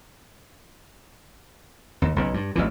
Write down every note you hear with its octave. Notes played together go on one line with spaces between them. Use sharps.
D#2
B1 C#3
G2
A1 D2 E3